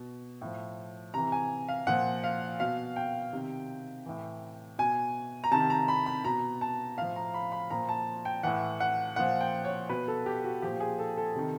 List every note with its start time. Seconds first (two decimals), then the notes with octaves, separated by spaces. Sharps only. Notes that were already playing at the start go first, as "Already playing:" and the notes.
Already playing: B2
0.41 A2 F3
1.14 C3 E3 A#5
1.32 G#5
1.68 F5
1.87 A#2 F3 F#5
2.24 F5
2.60 B2 F5
2.96 G5
3.33 C3 D#3
4.06 A2 E3
4.78 B2 G#5
5.44 A#5
5.51 C3 D#3 A5
5.70 A#5
5.88 B5
6.06 B5
6.24 B2 A#5
6.61 A5
6.97 A2 F3 F5
7.16 A#5
7.34 B5
7.52 B5
7.70 A#2 F3 A#5
7.89 A5
8.25 G5
8.43 A2 E3 F#5
8.80 F#5
9.16 A#2 F3 F#5
9.40 G5
9.65 C#5
9.89 B2 B4
10.08 A4
10.26 G4
10.44 F#4
10.62 A#2 F3 G4
10.80 G#4
10.99 A4
11.17 A4
11.35 C3 D#3